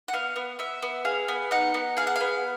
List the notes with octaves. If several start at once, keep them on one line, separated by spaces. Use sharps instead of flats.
F#5
B3 F5
B3
B3 E5
B3
G#4 F5
B3
D#4 F#5
B3
G#4 F5
F#5
B3 F5